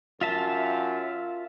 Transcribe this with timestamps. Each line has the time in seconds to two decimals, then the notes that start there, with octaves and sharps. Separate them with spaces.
0.21 F#2 F4 E5 A5